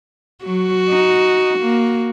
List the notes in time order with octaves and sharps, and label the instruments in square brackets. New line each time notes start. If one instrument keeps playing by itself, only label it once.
[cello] F#3 [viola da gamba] F#4
[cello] D#4
A#3